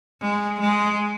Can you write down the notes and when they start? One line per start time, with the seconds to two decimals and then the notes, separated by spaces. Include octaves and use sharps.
0.21 G#3
0.60 G#3